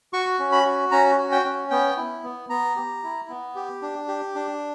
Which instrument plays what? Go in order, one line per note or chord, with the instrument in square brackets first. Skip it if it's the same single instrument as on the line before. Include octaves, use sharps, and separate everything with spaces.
[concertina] F#4 C#6
C#4
B5
F#4
C#4 A#5
F#4
G5
C#4
B3 G5
E4
B3
B3 A#5
G4
E4
B3
G4
D4
G4
D4